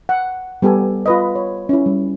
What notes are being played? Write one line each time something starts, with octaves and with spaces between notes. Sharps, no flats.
F#5
G3 B3 G4 A4 G#5
F4 B4 D#5
C#5
C#4 E4
G3